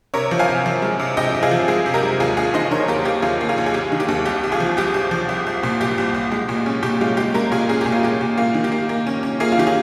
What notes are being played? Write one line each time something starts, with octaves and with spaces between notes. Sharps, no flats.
C3 A#4 C#5
F3
F5 G#5
C3
F3
G#3
C3
C3 D#5 G5
C3
F4 G#4
F3
G#3 F4 G#4
C3
G4 A#4
G#3
D#2 F4 G#4
D#2 F4 G#4
D#3 C5 D#5
D#3 A#4 C#5
D#2 G4 A#4
A#3 G4
D#2 F4 G#4
A#3
F4 G#4
D#2
G#4
D#2 G4
D#3
G4
D#2
C2 G4
C2
F4 G#4
F3
C2 G4
C2
F3
C2
C2
A#2
C2 G4
C2
C2
G#3
A#2
C#4
A#2 G4
G#3 F4
G#3 G4
G#3 G4 A#4
A#2 F4 G#4
C#4 G#4
A#2 G4
F4
G#3 G4
A#2
A#3 F4
D#3
G4
A#3
A#3
C#4
C#4
A#3 F4 G#4
F4
D#3 G4
F4 G#4